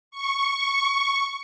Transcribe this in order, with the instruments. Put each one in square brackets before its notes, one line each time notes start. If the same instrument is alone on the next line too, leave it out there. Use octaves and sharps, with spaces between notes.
[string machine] C#6